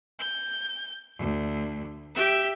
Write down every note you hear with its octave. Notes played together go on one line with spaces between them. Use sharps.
G6
D2
G4 E5 G5